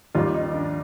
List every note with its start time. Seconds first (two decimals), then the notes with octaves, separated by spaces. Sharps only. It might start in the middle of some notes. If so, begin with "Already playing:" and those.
0.15 D#2 D#3 G3 F4
0.34 D#4
0.54 D4